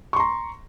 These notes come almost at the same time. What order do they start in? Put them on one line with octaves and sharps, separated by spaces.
C#6 C6 A#5